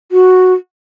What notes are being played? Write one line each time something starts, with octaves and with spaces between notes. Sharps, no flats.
F#4